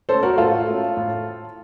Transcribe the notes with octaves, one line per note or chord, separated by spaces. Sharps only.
A3 C#4 A4 C5
F#4 A#4
A2 F4 A4
A3 C#4
A2